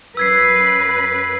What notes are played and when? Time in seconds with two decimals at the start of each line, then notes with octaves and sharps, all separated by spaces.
0.17 F#2 B4 E6 G#6 C7